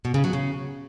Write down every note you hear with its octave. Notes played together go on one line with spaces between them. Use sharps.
B2
C#3
F#3
C#3